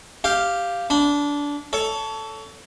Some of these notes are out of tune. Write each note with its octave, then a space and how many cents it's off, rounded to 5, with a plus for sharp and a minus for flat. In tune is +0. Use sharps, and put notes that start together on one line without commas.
G4 +0 F5 -5
D4 -20 B5 +0
A4 +0 C#5 +30